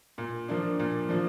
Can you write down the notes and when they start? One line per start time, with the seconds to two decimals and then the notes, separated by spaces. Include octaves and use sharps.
0.18 A#2
0.48 F3 A#3 D4
0.79 A#2
1.09 F3 A#3 D4